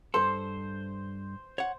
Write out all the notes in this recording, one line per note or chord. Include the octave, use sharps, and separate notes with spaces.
G2 A4 C5
C#5 F#5